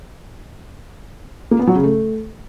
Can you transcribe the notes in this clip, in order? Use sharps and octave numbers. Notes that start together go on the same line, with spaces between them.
A#3
B3
F#3
C#3
A3